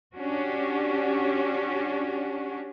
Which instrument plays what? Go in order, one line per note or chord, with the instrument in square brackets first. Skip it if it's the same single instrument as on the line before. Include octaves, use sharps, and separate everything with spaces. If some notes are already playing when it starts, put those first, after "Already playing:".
[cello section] C#4 D4 F#4 G4